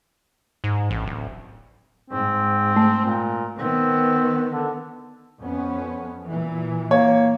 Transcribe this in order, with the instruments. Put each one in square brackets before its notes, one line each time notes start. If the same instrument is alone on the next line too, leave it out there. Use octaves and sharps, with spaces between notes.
[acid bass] G#2
A1
D1
[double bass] G#2 [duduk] C4
[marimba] A3
[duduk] A#2
[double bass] D#3 B3 [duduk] C4
[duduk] D3
[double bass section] F2 B3 C#4
A#2 E3
[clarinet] A#3 [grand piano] C#5